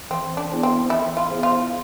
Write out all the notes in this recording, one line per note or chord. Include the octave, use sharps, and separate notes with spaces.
E3 C4
D4
B3 E4 G#4 C5
C4
E3 E4
F4
B3 E4 G#4 C5
F4